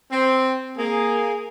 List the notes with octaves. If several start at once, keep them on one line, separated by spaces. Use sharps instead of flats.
C4
A#3 G#4